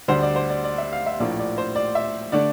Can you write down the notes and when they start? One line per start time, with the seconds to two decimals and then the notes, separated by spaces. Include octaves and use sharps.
0.08 D2 D3 G3 D4 C5
0.22 D5
0.36 C5
0.50 D5
0.64 D5
0.78 E5
0.92 F5
1.06 E5
1.20 A#1 A2 F3 A#3 D4 D5
1.39 D5
1.58 C5
1.75 D5
1.95 E5
2.32 D3 A3 D4 D5